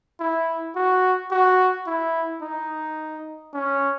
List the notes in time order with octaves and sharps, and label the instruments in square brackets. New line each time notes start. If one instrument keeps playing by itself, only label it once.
[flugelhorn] E4
F#4
F#4
E4
D#4
C#4